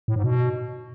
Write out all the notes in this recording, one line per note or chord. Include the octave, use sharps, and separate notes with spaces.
A2
G#2
B2